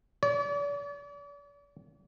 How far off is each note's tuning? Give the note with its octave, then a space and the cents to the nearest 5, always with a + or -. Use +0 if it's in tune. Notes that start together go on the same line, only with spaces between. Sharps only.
D5 -40